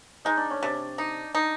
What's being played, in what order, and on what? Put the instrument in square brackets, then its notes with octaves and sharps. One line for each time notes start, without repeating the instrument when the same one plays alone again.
[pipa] G#3 [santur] D#4
[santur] D4
C#4
[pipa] C3 [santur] D4
[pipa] D#4
D#4